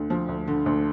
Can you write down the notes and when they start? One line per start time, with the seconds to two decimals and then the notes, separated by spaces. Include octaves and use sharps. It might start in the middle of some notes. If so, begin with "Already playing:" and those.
Already playing: D2 D3
0.10 F3
0.28 D2
0.47 D3
0.66 D2